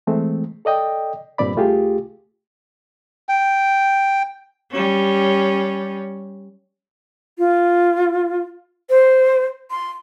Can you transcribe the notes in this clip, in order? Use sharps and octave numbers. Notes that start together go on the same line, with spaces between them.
E3 G#3 A3 C4
A4 D5 D#5 G5
C2 G2 A#2 C4 D5 B5
C2 A3 F4 G4 G#4
G5
G3 C#4
F4
C5
C6